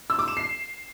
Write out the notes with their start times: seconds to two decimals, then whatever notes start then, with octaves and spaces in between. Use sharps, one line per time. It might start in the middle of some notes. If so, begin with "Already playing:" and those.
0.10 E6
0.19 D6
0.28 E7
0.37 C7